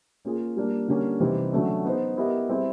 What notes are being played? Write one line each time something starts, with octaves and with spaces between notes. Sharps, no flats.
A#3 C#4 F4 G#4
G3 A#3 D4
D3 G3 A#3 C#4
C3 E3 G3 C4 D#4
D3 F#3 A3 C#4
B3 D#4 G#4 C5
B3 E4 G4 A#4 D#5
G3 C4 E4 G#4